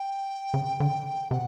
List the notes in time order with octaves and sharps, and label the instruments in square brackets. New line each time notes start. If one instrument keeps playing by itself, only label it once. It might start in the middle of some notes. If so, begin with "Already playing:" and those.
Already playing: [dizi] G5
[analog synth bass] C#3
D3
[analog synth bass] C3 [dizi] F#5